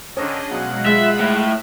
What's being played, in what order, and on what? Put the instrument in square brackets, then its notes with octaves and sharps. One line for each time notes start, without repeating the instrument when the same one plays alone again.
[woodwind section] D3 D#3 [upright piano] C#4 [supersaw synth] D4 G#4 D#5
[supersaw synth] B2 F#3 G#3 [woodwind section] D#5 F5 F#5
[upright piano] G#3 [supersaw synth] F4 B5 [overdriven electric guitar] E5
[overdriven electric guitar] A2 [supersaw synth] E5